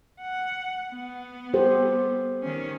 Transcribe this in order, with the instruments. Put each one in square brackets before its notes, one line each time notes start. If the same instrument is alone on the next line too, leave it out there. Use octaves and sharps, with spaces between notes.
[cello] F#5
B3
[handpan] G4 A4 C5
[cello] D#3 C#4